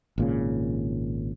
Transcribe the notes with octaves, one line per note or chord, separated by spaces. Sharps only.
G#1 A#2 C#3